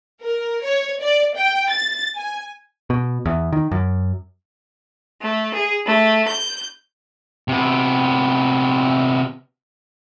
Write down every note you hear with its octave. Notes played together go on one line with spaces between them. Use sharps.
A#4
C#5
D5
G5
A6
G#5
B2
E2
D#3
F#2
A3
G#4
A3
G6
C3 B3